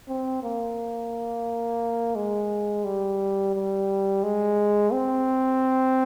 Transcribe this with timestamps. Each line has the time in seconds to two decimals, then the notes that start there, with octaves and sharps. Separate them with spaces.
0.08 C4
0.43 A#3
2.15 G#3
2.84 G3
3.54 G3
4.23 G#3
4.92 C4